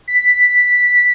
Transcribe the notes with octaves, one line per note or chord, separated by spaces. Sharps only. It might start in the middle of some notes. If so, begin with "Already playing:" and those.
B6